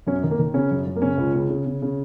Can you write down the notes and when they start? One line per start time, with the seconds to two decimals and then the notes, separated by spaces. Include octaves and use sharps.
0.07 F#2 C#4
0.23 D#3
0.31 A#3
0.39 D#3
0.54 C#3 C#4
0.71 F#2
0.86 F#2
0.96 A#3
1.02 C#3 C#4
1.18 C#2
1.35 C#3
1.50 C#3
1.66 C#3
1.82 C#3